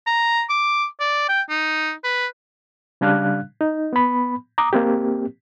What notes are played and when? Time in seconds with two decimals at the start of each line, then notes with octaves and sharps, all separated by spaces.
0.07 A#5
0.50 D6
1.00 D5
1.29 G5
1.49 D#4
2.04 B4
3.01 C#3 G3 D4 F5 F#6
3.61 D#4
3.93 B3 B5
4.58 A#5 D6 D#6
4.73 A#3 C4 G4